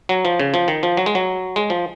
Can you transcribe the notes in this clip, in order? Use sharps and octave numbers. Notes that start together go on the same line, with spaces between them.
F#3
F3
C#3
F3
D#3
F3
F#3
G#3
F#3
G#3
F3